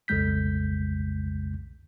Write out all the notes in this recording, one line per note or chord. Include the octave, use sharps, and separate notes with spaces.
B1 F2 C#3 G#3 G6 B6